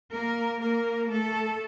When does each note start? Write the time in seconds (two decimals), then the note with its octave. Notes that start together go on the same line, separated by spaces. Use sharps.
0.14 A#3 A#4
0.62 A#3 A#4
1.11 A3 A4